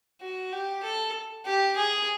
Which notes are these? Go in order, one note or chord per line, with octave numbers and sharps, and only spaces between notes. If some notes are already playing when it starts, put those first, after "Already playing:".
F#4
G4
A4
G4
G#4